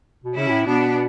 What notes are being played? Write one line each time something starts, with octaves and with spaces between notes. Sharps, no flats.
B2
C#3 C#4 E4
B2
A2
B2 B3 D4